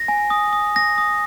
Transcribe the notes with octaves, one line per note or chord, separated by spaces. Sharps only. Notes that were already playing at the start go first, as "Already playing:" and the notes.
Already playing: A#6
G#5
D#6
D#6
D#6 A#6
D#6